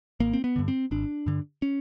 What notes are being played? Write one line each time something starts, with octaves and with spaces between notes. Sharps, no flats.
G#1 A#3
C4
B3
G2 D3
C4
G#1 D4
G2 D3
C#4